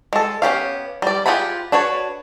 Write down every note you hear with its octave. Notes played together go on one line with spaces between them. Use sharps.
G#3 A4
B3 C#4 G4 F5
G3 D5
F4 G4 G#4 F#5 B5
D4 F#4 B4 C#5